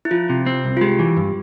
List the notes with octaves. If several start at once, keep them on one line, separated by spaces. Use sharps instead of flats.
E4
F3 F4
C3
C4
C2
F4
G#3 G4
E3
G2